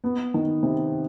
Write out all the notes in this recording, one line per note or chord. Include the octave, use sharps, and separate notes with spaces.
B3
D#3
C3